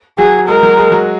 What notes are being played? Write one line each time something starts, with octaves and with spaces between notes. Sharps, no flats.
F#3 F#4 G#4
G#3 G#4 A#4
F#3 F#4
G#3 G#4
F#3 F#4